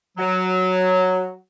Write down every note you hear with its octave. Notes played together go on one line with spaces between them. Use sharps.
F#3